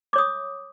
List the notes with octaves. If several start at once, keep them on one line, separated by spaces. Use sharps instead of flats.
C#5 D6 D#6